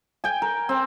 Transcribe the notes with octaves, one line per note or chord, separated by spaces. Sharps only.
G5 G#5
A#4
C4